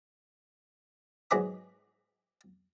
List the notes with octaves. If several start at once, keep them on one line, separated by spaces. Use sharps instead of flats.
G#2 F#3 G#4 B4 B5 D6